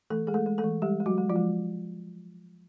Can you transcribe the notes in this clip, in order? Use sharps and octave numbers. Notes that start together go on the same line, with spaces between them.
E3 A3 A4
G#3 G#4
A3 A4
G#3
A3 A4
E3
G3 G#3 G4
G#3
F#3 F#4
G#3
F3 F4
G#3